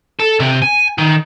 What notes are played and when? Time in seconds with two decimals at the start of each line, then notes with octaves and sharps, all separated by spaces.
0.20 A4
0.40 C3
0.62 G#5
0.98 D#3